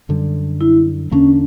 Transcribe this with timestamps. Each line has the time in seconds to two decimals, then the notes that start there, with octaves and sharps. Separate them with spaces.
0.09 F#2 D3 G3
0.61 E4
1.11 E2 D3 A#3 C#4 D4